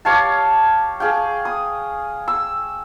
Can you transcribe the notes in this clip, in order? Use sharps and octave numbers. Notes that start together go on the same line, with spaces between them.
G4 C#5 F5 A5
G#4 F5 G5
D#6
E6